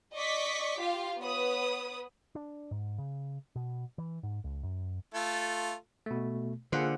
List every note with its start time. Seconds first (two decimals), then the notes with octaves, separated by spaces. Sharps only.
0.15 D5 D#5 C#6 D6 B6
0.78 F4 G4 F5
1.19 B3 B4 C#5 D#6
2.35 D4
2.71 G#2
2.98 C#3
3.55 B2
3.98 E3
4.23 G#2
4.44 C#2
4.63 F#2
5.14 A3 F4 A4
6.06 B2 A3
6.72 D3 A#3 F4 G#4 C5 F#5